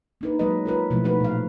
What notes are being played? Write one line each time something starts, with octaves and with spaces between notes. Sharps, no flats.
A#3 D#4 B4
F#3 G#3 A#3 B4 D#5
F4 A#4 B4
B2 F3 F#3 A3 E4
F3 G3 D#4 F#4 B4
A#2 A3 F5